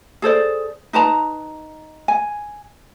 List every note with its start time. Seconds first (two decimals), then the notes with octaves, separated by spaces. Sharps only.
0.22 G#4 A4 C5 D5
0.93 D#4 B4 A5 A#5
2.08 G#5